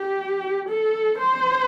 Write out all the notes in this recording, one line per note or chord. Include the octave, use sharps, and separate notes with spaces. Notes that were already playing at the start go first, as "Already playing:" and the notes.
Already playing: G4
A4
C5